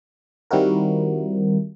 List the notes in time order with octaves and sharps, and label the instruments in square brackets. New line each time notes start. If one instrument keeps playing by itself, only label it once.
[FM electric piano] D#3 G3 C4 E4 F#4 A#4